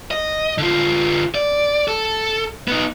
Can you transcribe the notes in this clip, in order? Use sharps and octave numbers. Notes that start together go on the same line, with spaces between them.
D#5
D3 F4
D5
A4
B3 D#4